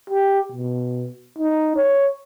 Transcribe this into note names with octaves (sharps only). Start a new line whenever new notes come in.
G4
B2
D#4
C#5